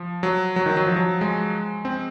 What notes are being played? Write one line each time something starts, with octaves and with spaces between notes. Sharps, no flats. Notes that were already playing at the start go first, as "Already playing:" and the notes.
Already playing: F3
F#3
F#3
D#3
F#3
F3
F#3
G#3
C4